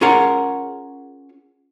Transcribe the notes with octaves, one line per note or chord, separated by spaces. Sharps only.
C#4 F4 G#4 A#4 C#5 F#5